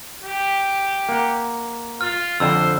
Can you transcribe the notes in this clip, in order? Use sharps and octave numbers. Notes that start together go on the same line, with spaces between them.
G4
A#3 F#5
F4 F6
F2 D3 C5 E6